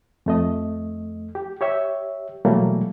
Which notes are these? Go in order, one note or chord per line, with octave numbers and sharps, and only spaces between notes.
F2 A3 D#5
G4
G4 C#5 E5
B2 E3 F#3 G3 A3 A#3